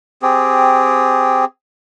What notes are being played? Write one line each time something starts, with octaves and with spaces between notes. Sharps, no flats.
C4 G4 G#4